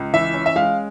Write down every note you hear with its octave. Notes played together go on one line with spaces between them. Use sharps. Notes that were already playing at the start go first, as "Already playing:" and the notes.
Already playing: C#2
E3 E5
C#4
E5
G#3 F5